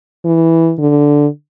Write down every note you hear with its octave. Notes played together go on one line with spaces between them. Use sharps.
E3
D3